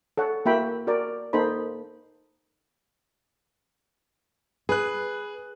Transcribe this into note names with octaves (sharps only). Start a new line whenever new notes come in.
A4 C#5 F#5
A#3 E4 F#4 E5 G5 B5
F#4 A#4 D5
A#3 D#4 A4 C5 B5
G#4 B4 F#6